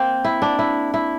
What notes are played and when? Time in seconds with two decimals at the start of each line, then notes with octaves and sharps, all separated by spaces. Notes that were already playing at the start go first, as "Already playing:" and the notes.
Already playing: A#3 C4
0.24 E4
0.42 D4
0.59 E4
0.94 E4